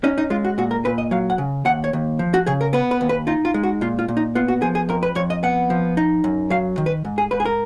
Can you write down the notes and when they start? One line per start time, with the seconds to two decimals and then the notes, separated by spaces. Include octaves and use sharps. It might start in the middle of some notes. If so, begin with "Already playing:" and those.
0.04 C#4 D#4
0.18 D#4
0.30 G#3 F4
0.45 F#4
0.58 A#2 F#4
0.71 A#4
0.85 A#2 B4
0.98 D#5
1.11 F#3 F5
1.30 F#5
1.38 C#3
1.65 D#2 F#5
1.84 C#5
1.93 D#2
2.19 F3
2.34 F#4
2.46 C#3 G#4
2.61 A#4
2.73 B3 B4
2.91 B4
3.01 D#2
3.09 B4
3.27 D#4 F4
3.45 F4
3.54 G#3
3.63 F#4
3.81 A#2 F4
3.99 F4
4.08 A#2
4.17 D#4
4.35 B3 F4
4.48 F#4
4.62 F3 G#4
4.75 G#4
4.89 F2 A#4
5.03 B4
5.15 F2 C#5
5.30 D#5
5.43 B3 F#5
5.70 F3
5.97 D#4
6.24 F#2
6.50 F#3 F5
6.78 D#3
6.86 B4
7.05 G#2
7.18 G#4
7.31 G#2 B4
7.40 G#4
7.45 A#4